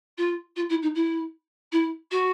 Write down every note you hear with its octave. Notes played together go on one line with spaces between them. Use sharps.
F4
F4
E4
D#4
E4
E4
F#4